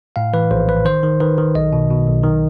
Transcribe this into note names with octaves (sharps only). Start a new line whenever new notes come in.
A2 F5
E3 B4
A#1 C5
A#1 B4
D#3 C5
D#3
D#3 B4
D#3
B1 D#5
B2
B2
B1
D#3